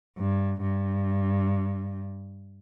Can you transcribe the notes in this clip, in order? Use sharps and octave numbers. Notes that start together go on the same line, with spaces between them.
G2
G2